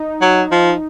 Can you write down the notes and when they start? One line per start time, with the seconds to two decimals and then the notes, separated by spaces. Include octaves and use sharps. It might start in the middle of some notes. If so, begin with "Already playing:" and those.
Already playing: D#4
0.22 F#3
0.51 F3